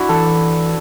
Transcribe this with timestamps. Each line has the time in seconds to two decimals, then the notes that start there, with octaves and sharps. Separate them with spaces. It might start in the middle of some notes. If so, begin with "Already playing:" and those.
Already playing: D4 E4 F#4
0.09 E3 A4